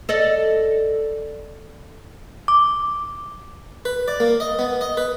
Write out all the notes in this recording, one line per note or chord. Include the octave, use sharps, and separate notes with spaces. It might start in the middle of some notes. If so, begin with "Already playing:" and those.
A4 D5 D#5
D6
B4
D5
A#3
D#5
B3
D#5
B4